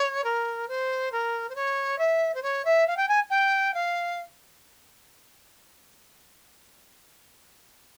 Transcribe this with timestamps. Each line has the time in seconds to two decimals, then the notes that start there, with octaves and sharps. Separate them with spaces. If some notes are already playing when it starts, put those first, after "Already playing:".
Already playing: C#5
0.24 A#4
0.68 C5
1.12 A#4
1.49 C5
1.55 C#5
1.98 E5
2.34 C5
2.43 C#5
2.65 E5
2.87 F5
2.97 G5
3.08 G#5
3.30 G5
3.74 F5